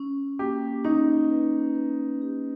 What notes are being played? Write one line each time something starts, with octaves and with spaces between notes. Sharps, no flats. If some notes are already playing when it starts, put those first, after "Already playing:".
Already playing: C#4
A#3 G4
C#4 D#4
B4
B4
G4